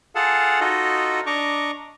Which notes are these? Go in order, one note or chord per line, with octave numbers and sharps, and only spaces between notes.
F4 G#4 A4 F5 F#5 A5
D#4 F4 F#4 A4 D#5
D4 D#5 A#5 C#6 D6